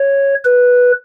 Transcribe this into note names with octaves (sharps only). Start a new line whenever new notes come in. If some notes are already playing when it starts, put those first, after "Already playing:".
Already playing: C#5
B4